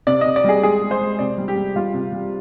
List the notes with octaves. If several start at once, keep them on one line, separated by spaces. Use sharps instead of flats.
C3 D5
C3 D#5
D5
G3 G#4
G#3 G#4
G#3
C5
G#3
C3 D5
G3
G4
G3
G3 F4
C3
G3